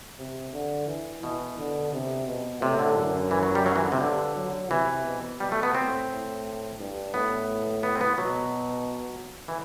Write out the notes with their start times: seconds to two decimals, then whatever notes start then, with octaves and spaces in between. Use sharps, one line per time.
0.18 C3
0.53 D3
0.87 E3
1.22 B2 E3
1.58 D3
1.93 C3
2.27 B2
2.62 A2 C3
2.79 D3
2.96 F#2
3.31 E3
3.43 F#3
3.55 G3
3.66 F#3
3.76 E3
3.84 D3
3.92 C3
4.01 G2 D3
4.36 F#3
4.70 C3 E3
5.05 B2
5.40 B2 G3
5.52 A3
5.63 B3
5.75 A2 C4
6.10 A2
6.79 G2
7.14 A2 B3
7.83 B3
7.95 C4
8.01 B3
8.18 B2 F#3
9.48 E3